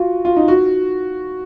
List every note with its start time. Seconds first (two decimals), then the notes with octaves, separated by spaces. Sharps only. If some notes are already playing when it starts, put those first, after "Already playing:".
Already playing: F4 F#4
0.25 F4
0.37 D#4
0.48 F#4